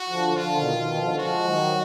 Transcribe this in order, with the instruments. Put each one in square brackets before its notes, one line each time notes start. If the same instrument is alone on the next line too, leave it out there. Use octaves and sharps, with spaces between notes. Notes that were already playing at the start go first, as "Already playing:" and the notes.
Already playing: [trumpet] F#4
[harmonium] D3 F3
[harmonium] D3 F3 [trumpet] F4
[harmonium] B2 D#3
B2 D#3
D3 F3
[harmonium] F3 G#3 [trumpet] F#4
[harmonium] D#3 F#3